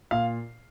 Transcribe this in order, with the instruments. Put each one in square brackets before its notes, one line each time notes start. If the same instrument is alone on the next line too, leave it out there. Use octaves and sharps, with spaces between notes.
[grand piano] A#2 F5